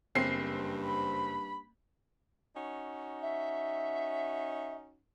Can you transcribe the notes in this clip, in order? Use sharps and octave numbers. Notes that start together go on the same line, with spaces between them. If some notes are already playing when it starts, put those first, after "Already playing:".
F#1 G2 C4 C7
B5
C#4 D#4 F#4
E5